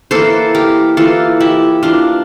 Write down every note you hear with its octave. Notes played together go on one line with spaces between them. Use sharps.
E3 A#3 A4 C5
G4 A#4
E3 A#3 F4 A4
E4 G4
E3 A#3 D4 F4